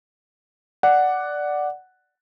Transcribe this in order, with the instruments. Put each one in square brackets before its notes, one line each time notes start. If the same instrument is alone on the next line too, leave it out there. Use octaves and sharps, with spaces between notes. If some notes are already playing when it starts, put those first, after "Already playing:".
[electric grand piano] D5 F#5